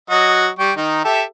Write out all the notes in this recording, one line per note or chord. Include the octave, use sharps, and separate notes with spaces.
F#3 F#4 D#5
G3 G5 C#6
D#3 D#4
G4 A4 E5